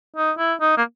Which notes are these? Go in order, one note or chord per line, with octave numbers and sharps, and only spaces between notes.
D#4
E4
D#4
A#3